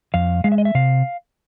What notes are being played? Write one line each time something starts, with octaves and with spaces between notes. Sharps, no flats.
F2 F5
G#3 F5
E5
D#5
E5
C3 F5